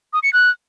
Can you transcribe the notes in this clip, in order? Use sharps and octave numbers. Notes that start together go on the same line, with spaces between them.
D#6
C#7
F#6